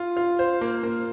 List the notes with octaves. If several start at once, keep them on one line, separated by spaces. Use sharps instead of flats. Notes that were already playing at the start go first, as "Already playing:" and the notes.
Already playing: F4
F4
C5
A#3
A#3